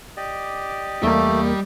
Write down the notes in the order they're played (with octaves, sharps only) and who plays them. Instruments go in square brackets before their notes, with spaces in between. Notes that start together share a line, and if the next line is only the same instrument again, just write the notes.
[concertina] G4 D5 D#5
[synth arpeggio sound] E2 A#3 [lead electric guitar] G3 [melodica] A3